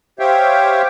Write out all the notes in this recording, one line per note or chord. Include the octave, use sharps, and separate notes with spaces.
G4 C5 C#5 E5 F5 G5